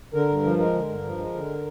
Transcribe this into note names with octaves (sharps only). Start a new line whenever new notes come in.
D3 A#4
G2
F3
G#3 A#4
D3
G2
F3
G#3
D3